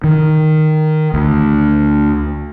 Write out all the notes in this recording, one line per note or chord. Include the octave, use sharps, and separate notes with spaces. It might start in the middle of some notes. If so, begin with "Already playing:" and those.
D#3
D2